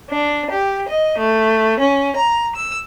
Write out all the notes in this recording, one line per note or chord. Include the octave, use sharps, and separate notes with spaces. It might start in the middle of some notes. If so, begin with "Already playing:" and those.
D4
G4
D#5
A3
C#4
A#5
E6